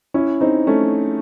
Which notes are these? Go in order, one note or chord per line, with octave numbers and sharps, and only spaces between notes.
C#4 E4
C4 D#4
A3 C#4